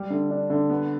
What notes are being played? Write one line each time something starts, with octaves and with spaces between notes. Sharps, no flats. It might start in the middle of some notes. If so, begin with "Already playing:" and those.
Already playing: G3
D3
D4
D3
B3